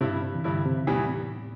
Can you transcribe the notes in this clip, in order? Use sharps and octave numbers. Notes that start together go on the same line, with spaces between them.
G2 C3 G3 E4
C3
E3
G2 D3 G3 E4
C3
E2 A2 E3 G3